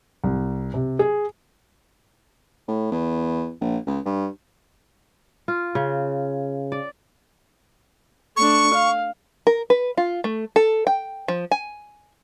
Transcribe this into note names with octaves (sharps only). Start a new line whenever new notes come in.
C2
C3
G#4
A2
E2
A#1
C#2
G2
F4
C#3
D5
A3 D4 C#6
F5
A#4
B4
F4
A3
A4
G5
F3
G#5